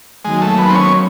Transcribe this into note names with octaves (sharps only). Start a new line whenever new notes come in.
D#3 F#3 G#3 A#3
A3
B3
C4
C#4